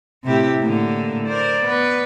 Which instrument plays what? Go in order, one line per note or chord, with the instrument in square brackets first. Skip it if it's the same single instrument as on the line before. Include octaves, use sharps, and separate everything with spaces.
[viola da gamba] A2 E4 G4 [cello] C3
[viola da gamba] A2 D3 [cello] A#3
[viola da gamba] A#4 C5 [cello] D5
[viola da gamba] B3 B4